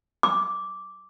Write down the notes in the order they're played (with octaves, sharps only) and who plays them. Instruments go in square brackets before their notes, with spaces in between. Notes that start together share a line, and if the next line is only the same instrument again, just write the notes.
[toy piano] D6